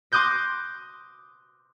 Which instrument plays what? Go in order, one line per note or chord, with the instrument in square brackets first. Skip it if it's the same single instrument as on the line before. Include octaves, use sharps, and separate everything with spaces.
[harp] C6 D6 D#6 F#6 G6 A#6